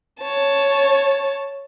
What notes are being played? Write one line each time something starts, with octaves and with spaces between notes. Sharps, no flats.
C#5 A5